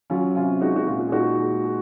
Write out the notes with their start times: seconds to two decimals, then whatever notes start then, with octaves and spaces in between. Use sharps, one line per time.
0.10 F#3 C#4 F4
0.35 C3 C#4 F4
0.61 G#3 D#4 F#4
0.76 F#4
0.87 A#2 C#4 F4
1.09 G#4
1.12 A#2 D#4 F#4
1.39 G#3
1.64 G#3